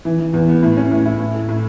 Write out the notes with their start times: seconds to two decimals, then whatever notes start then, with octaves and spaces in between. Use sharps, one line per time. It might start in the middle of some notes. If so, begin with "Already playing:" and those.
0.05 E3
0.19 E3
0.33 E2
0.48 B3
0.63 A2
0.77 C#4
0.91 A2
1.05 E4
1.19 A2
1.34 A3
1.49 A2